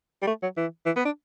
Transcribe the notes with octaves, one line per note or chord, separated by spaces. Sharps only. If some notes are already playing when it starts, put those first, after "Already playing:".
G3
A3
F#3
E3
E3
B3
D4